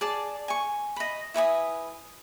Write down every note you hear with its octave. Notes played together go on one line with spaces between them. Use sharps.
G#4 D5 A5
G#5 C#6
D#5 B5
E4 B4 G#5 D#6